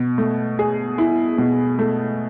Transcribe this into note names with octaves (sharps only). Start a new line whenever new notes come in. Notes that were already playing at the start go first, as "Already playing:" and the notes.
Already playing: B2
A3
G#4
E4
B2
A3